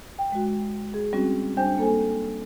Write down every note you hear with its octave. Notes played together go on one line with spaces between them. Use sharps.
G5
G#3 F#4
G#4
G3 C4 C#4 F#4
G3 D4 C5 G5 G#5 G6
A#3 A4 C5 G#5